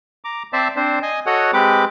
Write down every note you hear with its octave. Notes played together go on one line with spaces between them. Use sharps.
A#5 D6
C4 C5 D5 E5 A5
C4 D4 C5
D#5 G#5
F#4 A4 C#5 D#5 F#5
G#3 C4 G4 B4 D6